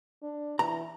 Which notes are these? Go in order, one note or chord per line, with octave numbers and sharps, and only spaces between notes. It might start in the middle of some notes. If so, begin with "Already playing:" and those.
D4
E3 A#5